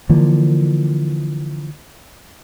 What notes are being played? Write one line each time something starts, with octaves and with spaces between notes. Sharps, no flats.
D3 E3 F3 A#3